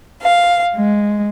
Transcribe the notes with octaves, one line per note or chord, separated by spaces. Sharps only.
F5
G#3